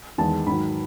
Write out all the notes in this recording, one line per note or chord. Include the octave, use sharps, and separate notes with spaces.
E2 D#3 G#3 A5
G#2 D#3 F#3 B5